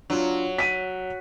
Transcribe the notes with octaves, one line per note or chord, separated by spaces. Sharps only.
F#3 D4 F4
B6 D#7